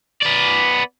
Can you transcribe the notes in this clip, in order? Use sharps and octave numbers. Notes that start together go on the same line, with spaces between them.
B3 D5